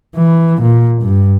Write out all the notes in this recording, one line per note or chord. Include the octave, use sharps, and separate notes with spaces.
E3
A#2
G2